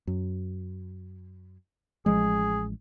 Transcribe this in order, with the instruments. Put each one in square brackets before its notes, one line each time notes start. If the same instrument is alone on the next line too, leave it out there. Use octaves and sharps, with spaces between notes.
[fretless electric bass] F#2
[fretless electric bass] A1 F3 G#3 [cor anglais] G#4